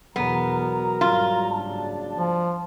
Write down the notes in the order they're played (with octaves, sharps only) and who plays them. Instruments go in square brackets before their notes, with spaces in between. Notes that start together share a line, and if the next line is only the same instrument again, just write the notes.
[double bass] E2 B2 [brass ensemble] F#3 A#4 A#5 [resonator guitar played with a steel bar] B3
[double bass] G#2 G3 [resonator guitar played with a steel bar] F4
[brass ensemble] F#1 D4 A5
[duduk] F3